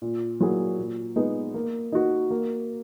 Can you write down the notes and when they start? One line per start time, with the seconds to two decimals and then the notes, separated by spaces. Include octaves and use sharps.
0.02 A#2
0.40 F#3 A#3 E4 G#4
0.78 A#2
1.16 G#3 B3 D#4 G#4
1.54 A#3
1.92 D#4 F#4
2.30 A#3